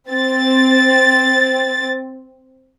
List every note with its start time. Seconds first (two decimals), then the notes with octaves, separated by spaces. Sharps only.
0.11 C4 A6